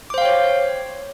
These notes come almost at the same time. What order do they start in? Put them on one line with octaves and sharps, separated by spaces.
D6 C5 F5 G5 C#5